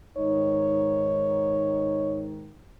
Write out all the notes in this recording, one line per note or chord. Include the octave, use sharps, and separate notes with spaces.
G#2 D#3 D#4 C#5